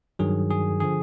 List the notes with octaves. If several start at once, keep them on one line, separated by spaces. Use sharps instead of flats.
G2 D#3 F#3 G#4
G#4
D3 F3 G#4